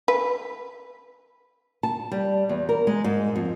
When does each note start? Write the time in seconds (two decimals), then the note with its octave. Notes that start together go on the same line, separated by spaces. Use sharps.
0.08 B4
1.83 A5
2.12 G3
2.49 E2
2.69 A#4
2.87 G#3
3.04 G#2
3.36 F2